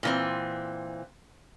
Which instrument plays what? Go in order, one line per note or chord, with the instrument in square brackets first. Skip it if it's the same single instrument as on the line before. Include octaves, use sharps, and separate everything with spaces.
[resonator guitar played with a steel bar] A#2 E3 C4